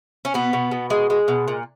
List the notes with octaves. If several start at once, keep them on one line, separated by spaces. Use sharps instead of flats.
C#4
B2 B3
B2
B2
G#3
G#3
B2
A#2